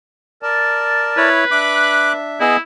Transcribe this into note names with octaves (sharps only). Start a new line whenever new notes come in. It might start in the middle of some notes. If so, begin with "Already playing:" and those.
A#4 D5 A5
E4 B4 C#5
D4 E5 D6 F#6
B3 E4 G#4 D#5